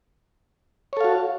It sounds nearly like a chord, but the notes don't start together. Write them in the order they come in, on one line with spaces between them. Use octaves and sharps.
C#5 A4 F5 F#4